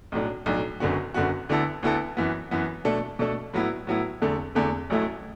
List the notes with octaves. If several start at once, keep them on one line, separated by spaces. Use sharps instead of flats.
B1 A2 F#3 D4
B1 A2 F#3 D4
F#1 F#2 D3 B3 F#4
F#1 F#2 D3 B3 F#4
D2 D3 B3 E4 A4
D2 D3 B3 E4 A4
F#2 E3 B3
F#2 E3 B3
B2 A3 D4 A4
B2 A3 D4 A4
A2 F#3 B3 E4
A2 F#3 B3 E4
E2 D3 A3
E2 D3 A3
A1 A2 F#3 A3 E4